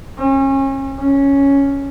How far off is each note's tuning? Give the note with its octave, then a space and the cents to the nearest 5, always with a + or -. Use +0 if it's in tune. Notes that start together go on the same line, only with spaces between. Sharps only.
C#4 -35
C#4 +0